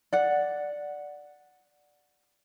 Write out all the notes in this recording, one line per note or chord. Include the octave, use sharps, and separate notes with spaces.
D5 F#5